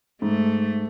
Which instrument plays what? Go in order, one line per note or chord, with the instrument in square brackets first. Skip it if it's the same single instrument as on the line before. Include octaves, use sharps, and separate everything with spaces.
[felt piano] G#2 [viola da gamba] A3